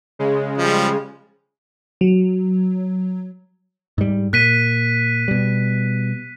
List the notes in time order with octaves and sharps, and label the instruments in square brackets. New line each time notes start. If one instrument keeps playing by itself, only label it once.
[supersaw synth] C#3 G#3
[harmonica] F3 G3
[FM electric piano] F#3
[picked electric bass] G#2 G3
[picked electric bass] A#2 [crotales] F#6 B6 D#7
[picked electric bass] B2 G3